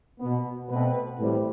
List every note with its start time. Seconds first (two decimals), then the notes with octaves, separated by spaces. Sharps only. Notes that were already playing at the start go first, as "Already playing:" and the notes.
0.19 B2 B3
0.70 B2 A3 C4 B4
1.19 A2 E3 G3 C4